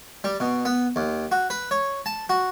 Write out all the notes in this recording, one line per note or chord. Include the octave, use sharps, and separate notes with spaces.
G3
B2
B3
D#2
F#4
B4
C#5
A5
F#4